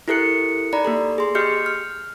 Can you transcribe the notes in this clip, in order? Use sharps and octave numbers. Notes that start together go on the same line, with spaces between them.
E4 G4 A4 A#4 F#6 C#7
D#4 D5 A#5 B5
A#3 G4 A4
G#4 C6
G4 D#5 F6 G6 C#7
F6